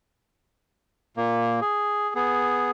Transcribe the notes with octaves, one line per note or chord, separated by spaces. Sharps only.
A#2 A#3
G#4
B3 G#4